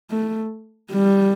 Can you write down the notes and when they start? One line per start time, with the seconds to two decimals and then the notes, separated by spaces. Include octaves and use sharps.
0.11 A3
0.92 G3